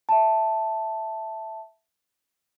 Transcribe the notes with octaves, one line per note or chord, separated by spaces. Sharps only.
E5 A5